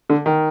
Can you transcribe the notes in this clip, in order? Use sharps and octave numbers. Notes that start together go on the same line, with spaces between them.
D3
D#3